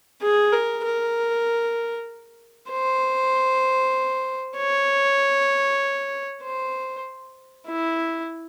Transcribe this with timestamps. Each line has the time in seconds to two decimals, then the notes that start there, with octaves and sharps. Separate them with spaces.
0.22 G#4
0.52 A#4
0.84 A#4
2.70 C5
4.57 C#5
6.43 C5
7.67 E4